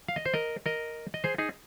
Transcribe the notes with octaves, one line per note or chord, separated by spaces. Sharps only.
F5
D#5
C5
A#4 D#5
A#4 D#5
D#5
G#4 C5
D#4 G#4